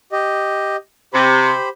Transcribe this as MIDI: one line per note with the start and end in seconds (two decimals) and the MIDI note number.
0.12 0.76 67
0.12 0.76 75
1.13 1.52 48
1.13 1.69 67
1.13 1.69 72
1.13 1.69 83